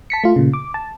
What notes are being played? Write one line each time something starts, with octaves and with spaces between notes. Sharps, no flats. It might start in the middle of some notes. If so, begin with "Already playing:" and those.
A5 B6 C#7
A3 F4
A#2 C#3
D6
A5